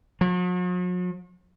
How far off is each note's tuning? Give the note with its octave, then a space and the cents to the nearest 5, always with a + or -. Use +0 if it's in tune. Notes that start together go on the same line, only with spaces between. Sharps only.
F#3 -45